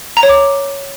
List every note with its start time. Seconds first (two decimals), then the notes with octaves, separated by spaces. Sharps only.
0.17 A#5
0.23 C#5
0.29 D6